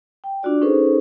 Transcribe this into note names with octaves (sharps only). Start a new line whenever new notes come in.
G5
D4 F4 F#4 D5
C#4 D#4 G#4 A4 B4 C5